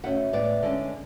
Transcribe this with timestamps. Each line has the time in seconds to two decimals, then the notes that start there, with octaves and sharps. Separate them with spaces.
0.03 B2 A3 C#4 F#5
0.33 A2 G#3 B3 D5
0.63 D3 G#3 C#4